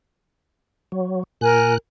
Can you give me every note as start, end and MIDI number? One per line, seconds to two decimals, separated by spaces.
0.92 1.23 54
1.41 1.78 46
1.41 1.73 70
1.41 1.73 80
1.41 1.78 90